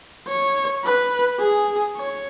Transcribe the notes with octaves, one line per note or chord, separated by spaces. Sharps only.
C#5
B4
G#4
C#5